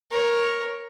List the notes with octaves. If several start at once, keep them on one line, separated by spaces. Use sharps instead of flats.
A#4 C#5